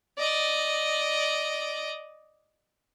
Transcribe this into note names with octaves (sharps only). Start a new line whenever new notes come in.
D5 D#5